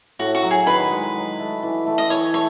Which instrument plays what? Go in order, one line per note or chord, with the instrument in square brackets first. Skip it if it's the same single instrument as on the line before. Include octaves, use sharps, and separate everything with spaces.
[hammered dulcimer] A2 [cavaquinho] F#4
[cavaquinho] F#4
[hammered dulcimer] F#3
[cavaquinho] G#4
[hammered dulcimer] D#3 [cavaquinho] B4
[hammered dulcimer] G#3
F#3
A3
E3
A3
[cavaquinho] D#5
[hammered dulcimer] E3 [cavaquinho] C#5
[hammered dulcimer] A3 [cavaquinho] C#5